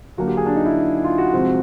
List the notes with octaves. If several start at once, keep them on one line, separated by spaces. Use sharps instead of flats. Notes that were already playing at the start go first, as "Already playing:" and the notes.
D3 F#3 A#3 D4 F#4
G4
G#4
D4
D#4
E4
F4
F#4
C3 F3 G#3 C4